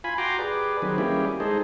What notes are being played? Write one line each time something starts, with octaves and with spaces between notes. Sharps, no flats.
F4 G#5 B5
F#4 G5 A#5 C6 D6
G4 G#4 B4 D5
D#3 F#3 C4 G#4 B4
G3 A#3 C#4 E4 G4 G#4
G#3 D#4 G#4 A4 C5